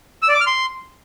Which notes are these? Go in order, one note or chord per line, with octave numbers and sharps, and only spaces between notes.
E6
D5
D6
F6
C6